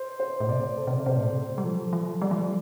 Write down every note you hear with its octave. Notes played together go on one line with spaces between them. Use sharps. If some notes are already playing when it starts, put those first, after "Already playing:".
Already playing: C5
C5
A2
C3 D5
C5
A4
C3
C5
D5
C3 C5
A2
C3
A4
G3
F3 A4
F3
G3 D5
F3
G3